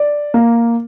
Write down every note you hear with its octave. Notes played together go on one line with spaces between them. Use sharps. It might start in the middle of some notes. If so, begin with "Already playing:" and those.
Already playing: D5
A#3